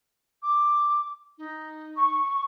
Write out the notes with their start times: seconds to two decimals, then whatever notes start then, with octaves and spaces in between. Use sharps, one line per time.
0.42 D6
1.38 D#4
1.96 C#6